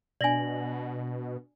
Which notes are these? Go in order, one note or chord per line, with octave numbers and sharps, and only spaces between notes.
B2 D4 D5 G#5 A#6 F#7